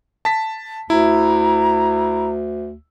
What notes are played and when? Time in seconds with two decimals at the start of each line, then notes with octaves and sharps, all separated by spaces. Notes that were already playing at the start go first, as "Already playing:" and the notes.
0.25 A5 B6
0.90 D2 E4 A#5